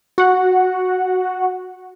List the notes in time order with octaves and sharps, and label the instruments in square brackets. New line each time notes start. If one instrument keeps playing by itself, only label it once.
[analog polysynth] F#4 F#5